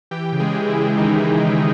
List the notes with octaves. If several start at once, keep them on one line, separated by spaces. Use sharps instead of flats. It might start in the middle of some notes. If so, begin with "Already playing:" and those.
E3 G4 G5
C#3
G#3 G#4
G#3
E3 E4
C#3
D#3 E3 D#4